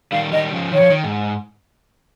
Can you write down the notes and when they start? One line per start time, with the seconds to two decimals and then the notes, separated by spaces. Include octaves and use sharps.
0.12 D#3 G3 F5
0.32 D#3 G3 D#5
0.52 C#3 F3
0.72 D#3 C#5
0.81 F3
0.90 D#3
1.04 G#2